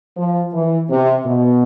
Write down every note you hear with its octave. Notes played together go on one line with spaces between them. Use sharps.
F3
E3
C3
B2